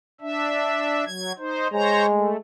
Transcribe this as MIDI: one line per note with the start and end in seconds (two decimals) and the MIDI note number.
0.21 1.04 62
0.21 1.04 76
1.06 1.32 54
1.06 1.32 92
1.38 1.68 63
1.38 1.68 72
1.73 2.36 56
1.73 2.06 72
1.73 2.06 73
1.73 2.06 82
2.07 2.37 57